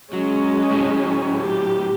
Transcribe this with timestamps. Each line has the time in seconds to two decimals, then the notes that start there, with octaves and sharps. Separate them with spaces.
0.13 F#3 G#3 C#4
0.71 A2 F#3
1.39 G4